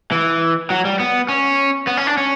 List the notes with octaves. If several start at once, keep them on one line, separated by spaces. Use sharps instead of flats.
E3
F#3
G3
B3
C#4
B3
C#4
D4
C#4